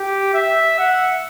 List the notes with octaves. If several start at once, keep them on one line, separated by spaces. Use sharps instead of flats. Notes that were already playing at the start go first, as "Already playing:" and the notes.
Already playing: G4
E5
F#5